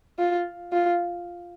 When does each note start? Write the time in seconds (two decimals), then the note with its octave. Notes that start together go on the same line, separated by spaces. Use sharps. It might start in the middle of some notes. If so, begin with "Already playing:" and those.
0.19 F4
0.72 F4